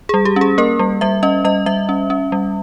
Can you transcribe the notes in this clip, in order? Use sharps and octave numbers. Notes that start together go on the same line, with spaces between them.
G3 G#4
G4
C#4 G#4
A#3 A#4
G3
G3 E5
C#4 D#5
G3 D#5
G3 E5
C#4
C#4
G3